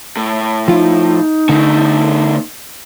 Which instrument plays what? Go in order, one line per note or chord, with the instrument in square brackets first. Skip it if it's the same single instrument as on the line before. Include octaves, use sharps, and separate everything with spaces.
[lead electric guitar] A2
[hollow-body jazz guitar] F3 F4 [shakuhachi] D#4
[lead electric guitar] E2 A3 [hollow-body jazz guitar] D3